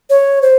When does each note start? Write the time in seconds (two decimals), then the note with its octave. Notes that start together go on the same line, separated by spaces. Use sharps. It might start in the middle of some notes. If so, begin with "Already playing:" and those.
0.10 C#5
0.42 C5